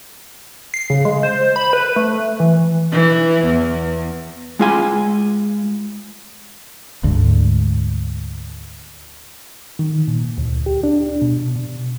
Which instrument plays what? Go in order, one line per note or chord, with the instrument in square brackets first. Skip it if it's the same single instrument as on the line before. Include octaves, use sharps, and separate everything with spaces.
[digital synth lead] C7
C#3
G#3
C5
B5
B4
A3
E3
[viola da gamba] E3
E2
[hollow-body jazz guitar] G#3 F4 G#5
[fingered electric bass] D2 G#2
[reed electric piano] D#3
A#2
D2
G4
D4
B2
B2